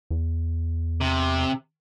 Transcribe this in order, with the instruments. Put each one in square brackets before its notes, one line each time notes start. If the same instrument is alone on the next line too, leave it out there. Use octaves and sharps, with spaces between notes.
[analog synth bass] E2
[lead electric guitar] C3